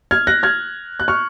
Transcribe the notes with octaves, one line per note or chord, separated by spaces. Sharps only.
F6 G#6
F#6 A#6
F6 G#6
F#6
C#6 F6